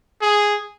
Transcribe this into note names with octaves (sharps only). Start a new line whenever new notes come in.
G#4